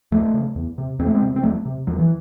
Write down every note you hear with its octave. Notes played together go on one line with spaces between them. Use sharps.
D#2 F#3 A3
C#3
E2
C3
E2 C4
A3
G#3 C4
C3
C4
E2 F#3 A3
C3
E2 F#3
E3